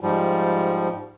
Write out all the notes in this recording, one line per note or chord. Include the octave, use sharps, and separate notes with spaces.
G#2 F3 G3